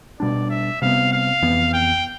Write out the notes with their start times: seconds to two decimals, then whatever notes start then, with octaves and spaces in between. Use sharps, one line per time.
0.20 B2 G3 D4 D5
0.50 E5
0.82 C3 G3 B3 F5
1.12 F5
1.42 F2 E3 B3
1.73 G5